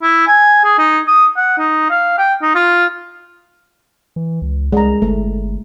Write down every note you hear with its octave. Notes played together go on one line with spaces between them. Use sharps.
E4
G#5
G#4
D#4
D#6
F#5
D#4
F5
G5
D#4
F4
E3
C#2
C2 G#3 A#5
G1 A3